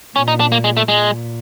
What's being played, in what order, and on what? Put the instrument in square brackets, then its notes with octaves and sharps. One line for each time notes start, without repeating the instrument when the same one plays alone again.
[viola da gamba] A#2 [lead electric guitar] C#4
[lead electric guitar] D#4
D4
A#3
G#3
A3
[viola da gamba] A#2 [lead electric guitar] G#3